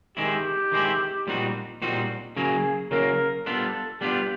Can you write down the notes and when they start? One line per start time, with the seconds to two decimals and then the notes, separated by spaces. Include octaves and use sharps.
0.17 D#3 G#3 C4 E4 G4
0.72 D#3 G#3 C4 E4
1.27 A#2 G3 C4 D#4 F#4
1.82 A#2 G3 C4 D#4 F#4
2.37 C#3 F#3 A#3 G#4
2.91 C#3 F#3 A#3 A#4
3.46 G3 B3 D4 F4 A4
4.01 G3 B3 D4 F4 G4